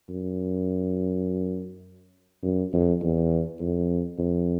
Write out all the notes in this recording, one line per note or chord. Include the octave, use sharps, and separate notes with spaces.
F#2
F#2
F2
E2
F2
F2